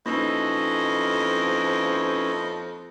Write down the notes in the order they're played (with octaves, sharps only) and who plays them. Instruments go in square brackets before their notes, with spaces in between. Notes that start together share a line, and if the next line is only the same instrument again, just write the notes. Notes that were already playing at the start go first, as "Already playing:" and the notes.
[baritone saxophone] F2 [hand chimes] A#3 D#4 [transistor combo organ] C#4 E4 B4 [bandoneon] D#5